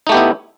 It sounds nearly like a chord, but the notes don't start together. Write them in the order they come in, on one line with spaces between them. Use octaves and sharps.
D#4 A3 G4 B3 E4